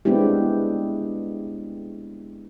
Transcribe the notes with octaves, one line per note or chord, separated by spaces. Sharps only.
G#3 B3 C4 D4 E4 G4